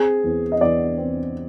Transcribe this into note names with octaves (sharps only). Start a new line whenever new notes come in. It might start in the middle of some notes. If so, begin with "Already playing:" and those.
Already playing: C4 G#4
E2
D#5
E2 D5
C4